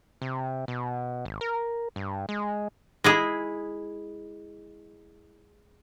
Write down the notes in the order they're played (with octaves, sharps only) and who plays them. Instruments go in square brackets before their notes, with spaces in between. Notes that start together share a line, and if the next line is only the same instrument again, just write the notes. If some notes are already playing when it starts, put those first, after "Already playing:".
[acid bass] C3
B2
G#1
A#4
G2
G#3
[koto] G#3 E4 G#4